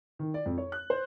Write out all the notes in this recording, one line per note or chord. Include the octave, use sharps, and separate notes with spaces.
D#3
D5
F2
C#5
F#6
C5